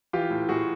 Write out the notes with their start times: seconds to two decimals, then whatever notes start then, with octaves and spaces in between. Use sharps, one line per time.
0.13 E3 F4 G4
0.31 A2
0.49 A2 F#4 G#4